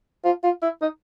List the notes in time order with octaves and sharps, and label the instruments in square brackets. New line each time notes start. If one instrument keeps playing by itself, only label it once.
[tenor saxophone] F4
F4
E4
D#4